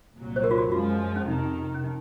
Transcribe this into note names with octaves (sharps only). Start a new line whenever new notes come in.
C2 A#2 F#3
C5
A#4
F4
F#4
F#2 F3 G#3 F4
C#4
F2 C3 D#3 D#4
C#4
D#4